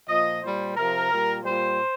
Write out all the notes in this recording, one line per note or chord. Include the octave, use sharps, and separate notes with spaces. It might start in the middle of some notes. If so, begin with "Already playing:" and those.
A#2 F3 D#5
A#2 G3 C5
C3 F3 A#4
A#2 G3
A#2 G3 C5